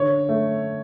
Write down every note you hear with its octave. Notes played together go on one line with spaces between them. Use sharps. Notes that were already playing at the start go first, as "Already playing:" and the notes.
Already playing: D3 C#5
A3